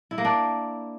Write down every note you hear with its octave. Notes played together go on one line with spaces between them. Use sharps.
E4
A#3
D4